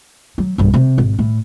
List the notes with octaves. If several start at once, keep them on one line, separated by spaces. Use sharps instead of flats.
F#3
B1 G2
C3
G#1
A2